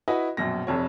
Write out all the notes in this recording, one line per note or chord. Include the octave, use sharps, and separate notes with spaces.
E4 F#4 B4 D#5
A#1 F#2 B2 A#6
F1 F2 C#5